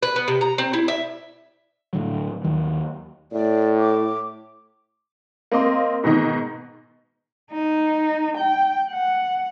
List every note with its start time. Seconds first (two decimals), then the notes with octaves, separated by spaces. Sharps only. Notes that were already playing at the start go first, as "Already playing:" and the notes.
0.03 B4
0.16 B3
0.28 C3
0.41 A#5
0.58 C4
0.73 E4
0.88 E5
1.93 A2 D3 F#3
2.44 D#2 D#3 F#3
3.32 A2 D5
3.78 D6
5.51 A#3 C4 D#5 C6
6.04 G#2 B2 D#3 D#4
7.52 D#4
8.37 G5
8.91 F#5